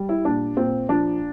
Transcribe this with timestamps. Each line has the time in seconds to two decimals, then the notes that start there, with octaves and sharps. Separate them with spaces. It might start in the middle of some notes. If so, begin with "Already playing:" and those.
Already playing: G3
0.09 E4
0.25 A#2 D4
0.57 A#2 C4
0.89 F3 D4